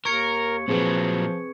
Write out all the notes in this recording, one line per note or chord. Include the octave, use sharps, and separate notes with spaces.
D#2 A#4 C#6 G#6 C#7
A#2 F3 F#3 C4 G#4 B4